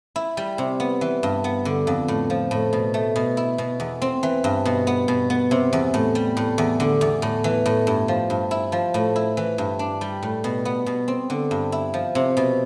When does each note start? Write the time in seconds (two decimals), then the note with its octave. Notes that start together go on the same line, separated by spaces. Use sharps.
0.16 E4
0.37 G3
0.58 C3
0.80 B3
1.01 E3
1.23 G2
1.44 B3
1.65 D3
1.87 F2
2.08 A2
2.30 F3
2.51 A2
2.73 B2
2.94 A3
3.16 B2
3.37 E4
3.58 B2
3.80 E2
4.02 C4
4.23 E3
4.44 G2
4.65 B2
4.87 B3
5.08 B2
5.30 B3
5.51 C3
5.73 E2
5.94 A2
6.15 G3
6.37 A2
6.58 E2
6.80 D3
7.01 E2
7.22 A2
7.44 E3
7.66 A2
7.87 G2
8.08 F3
8.30 G2
8.51 E4
8.72 F3
8.94 A2
9.16 E4
9.37 E3
9.58 G2
9.79 D4
10.01 G3
10.23 A2
10.44 B2
10.65 B3
10.86 B2
11.08 C4
11.30 D3
11.51 G2
11.72 E4
11.94 F3
12.15 C3
12.37 B2